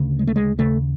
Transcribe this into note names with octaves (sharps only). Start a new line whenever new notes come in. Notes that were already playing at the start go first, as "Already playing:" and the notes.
Already playing: D2 C#3
G#3
A3
G#3
D#2 C#3 A3